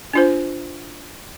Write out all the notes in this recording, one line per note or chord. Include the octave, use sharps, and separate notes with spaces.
D4 F4 C5